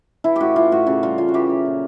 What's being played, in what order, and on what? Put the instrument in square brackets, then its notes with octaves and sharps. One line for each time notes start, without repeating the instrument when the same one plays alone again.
[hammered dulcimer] E3 E4
A2 F#4 G4
E3 F4
A2 F#4
C#3 F#4
G3 F4
C#3 F4
F#4
E3 G4
F#3
A#2